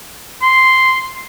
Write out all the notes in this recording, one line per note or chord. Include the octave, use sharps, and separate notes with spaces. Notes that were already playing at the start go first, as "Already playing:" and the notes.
C6